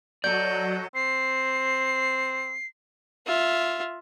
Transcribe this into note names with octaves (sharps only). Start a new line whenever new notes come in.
F#3 A4 D5 D#5 G6
C4 C7
F4 E5